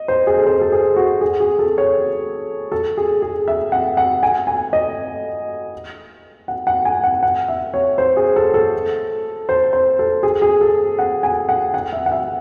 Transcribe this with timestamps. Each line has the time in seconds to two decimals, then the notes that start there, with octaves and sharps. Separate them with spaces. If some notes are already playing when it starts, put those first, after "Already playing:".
Already playing: D#5
0.08 C5
0.27 G#4
0.37 A4
0.46 C5
0.61 A4
0.72 G#4
0.96 F#4
1.21 G#4
1.40 G#4
1.59 A4
1.78 C#5
2.72 A4
2.97 G#4
3.22 G#4
3.48 E5
3.72 F#5
3.97 F#5
4.23 G#5
4.47 G#5
4.73 D#5
6.48 F#5
6.67 F#5
6.85 G#5
7.04 F#5
7.23 F#5
7.48 E5
7.74 C#5
7.98 C5
8.17 G#4
8.36 A4
8.54 A4
9.49 C5
9.73 C5
9.99 A4
10.23 G#4
10.42 G#4
10.61 A4
10.99 F#5
11.23 G#5
11.49 F#5
11.74 F#5
11.93 E5
12.06 F#5
12.12 E5